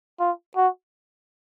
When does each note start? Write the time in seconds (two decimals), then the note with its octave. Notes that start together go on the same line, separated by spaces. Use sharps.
0.20 F4
0.56 F#4